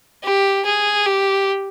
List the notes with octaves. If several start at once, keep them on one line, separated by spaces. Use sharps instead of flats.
G4
G#4
G4